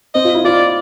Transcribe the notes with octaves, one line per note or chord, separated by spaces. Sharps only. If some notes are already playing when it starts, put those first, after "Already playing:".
C4 D#5
F4
E4
F4 D5